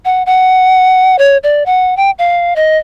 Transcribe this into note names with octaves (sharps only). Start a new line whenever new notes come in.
F#5
F#5
C#5
D5
F#5
G5
F5
D#5